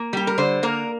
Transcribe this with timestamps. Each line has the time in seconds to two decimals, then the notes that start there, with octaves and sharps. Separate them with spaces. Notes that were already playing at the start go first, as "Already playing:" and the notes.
Already playing: A#3
0.13 G3 G4
0.27 A#4
0.38 D3 C5
0.63 A#3 A#4